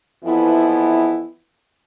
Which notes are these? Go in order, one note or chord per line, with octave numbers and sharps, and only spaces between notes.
F2 E3 B3 E4